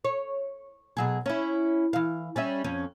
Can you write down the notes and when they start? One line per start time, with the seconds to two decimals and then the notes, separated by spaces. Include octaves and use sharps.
0.05 C#5
0.97 B2 F#3 G#4
1.26 C#4 E4
1.93 E3 F5
2.36 G3 C#4 E5
2.64 F2 C#4